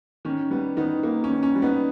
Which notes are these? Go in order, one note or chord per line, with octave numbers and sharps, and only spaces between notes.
D#3 C#4
G3 B3
D#3 B3 D#4
A#3
C#4
D#3
C#4
G3
B3 D#4